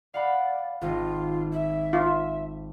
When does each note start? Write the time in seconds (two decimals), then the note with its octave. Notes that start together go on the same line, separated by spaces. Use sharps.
0.14 D5 F5 F#5 B5
0.81 G#1 F4 D#5
1.52 E5
1.93 F4